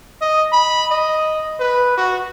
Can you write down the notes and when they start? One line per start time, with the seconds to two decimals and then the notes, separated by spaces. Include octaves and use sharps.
0.22 D#5
0.53 B5
0.91 D#5
1.60 B4
1.98 F#4